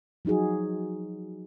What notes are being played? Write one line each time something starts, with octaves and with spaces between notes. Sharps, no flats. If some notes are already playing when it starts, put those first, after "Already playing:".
F3 F#3 D#4 F#4 G#4